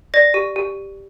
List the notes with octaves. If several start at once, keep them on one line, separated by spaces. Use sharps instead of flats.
D5 A#6
G4
G4